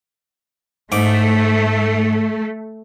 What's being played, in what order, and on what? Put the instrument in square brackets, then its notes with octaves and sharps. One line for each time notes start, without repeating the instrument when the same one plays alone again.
[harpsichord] G#2 D6 [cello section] A3